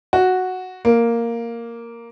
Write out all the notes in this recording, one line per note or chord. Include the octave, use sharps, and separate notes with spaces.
F#4
A#3